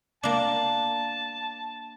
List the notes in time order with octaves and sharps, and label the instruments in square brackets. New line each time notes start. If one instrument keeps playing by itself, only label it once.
[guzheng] A#3 D4 [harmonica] A5